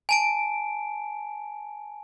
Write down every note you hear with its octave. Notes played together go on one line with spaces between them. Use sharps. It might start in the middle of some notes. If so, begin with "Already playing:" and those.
G#5 A5 D7